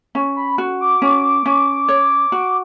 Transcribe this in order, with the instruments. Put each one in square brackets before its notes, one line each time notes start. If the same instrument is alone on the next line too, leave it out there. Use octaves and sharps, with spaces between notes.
[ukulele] C#4
[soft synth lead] B5
[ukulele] F#4
[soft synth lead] D6
[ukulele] C#4
C#4
C#5
F#4